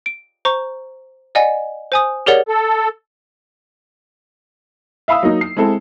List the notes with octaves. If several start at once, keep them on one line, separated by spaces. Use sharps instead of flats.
D7
C5 A#5 C#6
D5 D#5 F#5 G#5
C5 G#5 D#6
G4 G#4 A#4 C#5 D5 F#5
A4
E5 F5 B5 D#6 E6
F#3 A#3 D#4
C7
G#3 C4 E4 A4